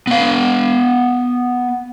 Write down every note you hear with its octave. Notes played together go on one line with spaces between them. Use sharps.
B3 F5